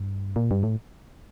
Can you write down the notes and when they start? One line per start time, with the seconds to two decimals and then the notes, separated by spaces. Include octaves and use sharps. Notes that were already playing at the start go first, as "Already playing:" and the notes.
Already playing: G2
0.36 A#2
0.51 G2
0.63 A2